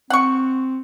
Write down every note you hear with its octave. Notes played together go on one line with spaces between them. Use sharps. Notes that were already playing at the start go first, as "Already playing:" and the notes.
C4 F#5 C#6